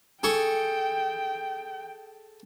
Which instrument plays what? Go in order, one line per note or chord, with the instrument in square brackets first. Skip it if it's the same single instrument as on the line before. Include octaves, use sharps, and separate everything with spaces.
[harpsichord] G#4 A4 C#6 [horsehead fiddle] G5